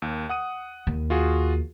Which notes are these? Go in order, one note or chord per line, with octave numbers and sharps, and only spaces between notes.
D#2
F#5 D#6 D#7
D#2
F4 F#4 G#4